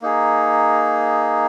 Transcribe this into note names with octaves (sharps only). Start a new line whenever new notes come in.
A#3 D#4 G#4